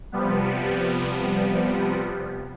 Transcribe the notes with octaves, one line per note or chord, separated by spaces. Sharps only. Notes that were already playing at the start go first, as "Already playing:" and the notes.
C3 F3 G3 B3